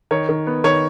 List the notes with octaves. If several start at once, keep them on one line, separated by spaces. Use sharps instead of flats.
D#3 C#5
D#3
B3
D#3 C#5